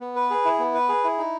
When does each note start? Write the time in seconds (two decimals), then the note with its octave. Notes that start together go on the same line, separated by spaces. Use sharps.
0.01 B3
0.16 B4
0.30 G#4
0.45 E4
0.59 B3
0.74 B4
0.89 G#4
1.04 E4
1.18 D#4